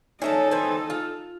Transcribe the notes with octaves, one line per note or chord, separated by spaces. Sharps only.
C#4 D#4 A4 E5 A5
C4 B4 G#5
F4